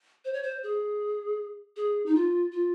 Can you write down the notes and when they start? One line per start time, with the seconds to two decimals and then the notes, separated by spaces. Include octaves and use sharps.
0.25 C5
0.33 C#5
0.43 C5
0.63 G#4
1.76 G#4
2.06 D#4
2.15 F4
2.52 F4